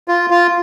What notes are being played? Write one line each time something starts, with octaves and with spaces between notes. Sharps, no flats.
F4
F4